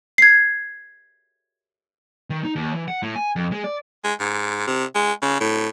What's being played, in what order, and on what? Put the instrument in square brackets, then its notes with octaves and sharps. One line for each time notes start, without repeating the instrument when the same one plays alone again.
[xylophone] G#6 C7
[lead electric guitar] D#3
D#4
D#2
E3
F#5
A2
G#5
F2
G#3
D5
[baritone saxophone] G#3
G#2
C3
G#3
C#3
A2